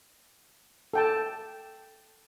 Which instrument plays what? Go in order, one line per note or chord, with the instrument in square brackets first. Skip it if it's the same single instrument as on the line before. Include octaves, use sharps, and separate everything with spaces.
[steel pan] A4 G5 A5